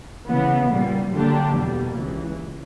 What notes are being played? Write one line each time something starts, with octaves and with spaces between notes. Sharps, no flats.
C#3 E3 B3
A#2 G3 A#3
D3 F#3 A#3 D4 G4
E2 B2 G3 A#3
C#2 C#3 E3